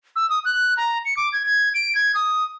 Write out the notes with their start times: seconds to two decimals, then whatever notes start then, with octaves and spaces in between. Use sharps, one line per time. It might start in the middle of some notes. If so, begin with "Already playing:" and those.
0.16 E6
0.30 D#6
0.45 F#6
0.77 A#5
1.05 C#7
1.17 D6
1.33 G#6
1.46 G#6
1.74 D7
1.95 G#6
2.15 D#6